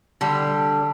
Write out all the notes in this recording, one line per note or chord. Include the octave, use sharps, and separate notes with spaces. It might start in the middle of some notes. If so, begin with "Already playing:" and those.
D3 G3